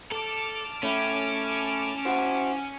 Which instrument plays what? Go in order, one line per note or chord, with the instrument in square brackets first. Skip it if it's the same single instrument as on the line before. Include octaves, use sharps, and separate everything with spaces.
[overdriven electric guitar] A4 [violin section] A5 D6 F6
[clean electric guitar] A3 E4 [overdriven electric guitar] C#4
[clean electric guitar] E4 F#4 C5